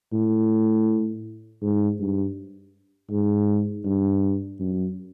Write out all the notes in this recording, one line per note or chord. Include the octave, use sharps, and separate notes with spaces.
A2
G#2
G2
G#2
G2
F#2